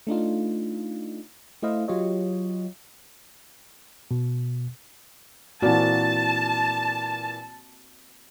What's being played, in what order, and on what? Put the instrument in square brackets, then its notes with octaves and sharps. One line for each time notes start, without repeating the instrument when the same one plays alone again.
[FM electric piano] A3 D4 D#4 F4
A3 E4 C5 D#5 F5
F#3 F4 G4 C#5 D#5
[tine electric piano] B2
[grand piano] A#2 E3 [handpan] A#3 C4 F#4 [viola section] A5